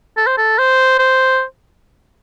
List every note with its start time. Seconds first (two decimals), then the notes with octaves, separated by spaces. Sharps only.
0.17 A4
0.26 C5
0.37 A4
0.58 C5
0.99 C5